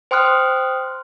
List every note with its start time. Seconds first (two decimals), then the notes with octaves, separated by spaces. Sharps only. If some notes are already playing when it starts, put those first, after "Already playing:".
0.11 C5 G5 C6 D#6 F6 F#6